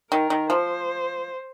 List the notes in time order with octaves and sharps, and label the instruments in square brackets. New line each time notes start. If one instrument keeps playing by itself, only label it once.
[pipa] D#3 [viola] A#4
[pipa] D#3
[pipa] F3 [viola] C5